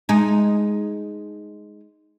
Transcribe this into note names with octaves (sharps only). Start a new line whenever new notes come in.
G#3 D#4